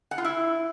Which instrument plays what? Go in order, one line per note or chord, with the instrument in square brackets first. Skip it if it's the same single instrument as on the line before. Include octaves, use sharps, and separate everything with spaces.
[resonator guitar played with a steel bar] F#5
F4
E4